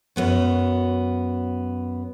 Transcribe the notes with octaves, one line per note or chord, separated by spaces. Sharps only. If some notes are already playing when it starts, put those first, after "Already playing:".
F#2 B3 F#4